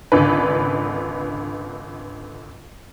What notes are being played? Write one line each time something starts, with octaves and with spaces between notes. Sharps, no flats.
G#1 C#2 D3 B4